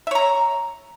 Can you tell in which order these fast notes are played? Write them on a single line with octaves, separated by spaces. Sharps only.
E5 C#5 A#5